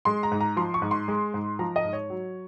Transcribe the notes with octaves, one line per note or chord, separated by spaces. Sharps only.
G#3 C6
A#5
G#2
A#5
F3 C6
C#6
G#2
C6
G#3
G#2
F3 A#5
D#5
G#2
C#5
F#3